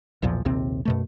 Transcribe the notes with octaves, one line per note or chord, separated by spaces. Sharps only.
B1 E2 A#2 F3
A#1 D#2 C3 C4
F#2 B2 A3